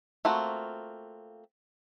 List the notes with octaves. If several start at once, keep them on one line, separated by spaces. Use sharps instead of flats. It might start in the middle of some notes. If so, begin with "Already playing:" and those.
A3 A#3 C4 F4 F#4